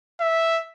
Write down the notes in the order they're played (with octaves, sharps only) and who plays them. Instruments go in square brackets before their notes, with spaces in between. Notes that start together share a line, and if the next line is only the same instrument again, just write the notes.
[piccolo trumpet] E5